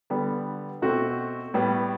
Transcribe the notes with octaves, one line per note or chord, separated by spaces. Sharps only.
D3 G3 B3
B2 A3 C4 F#4
A2 G3 B3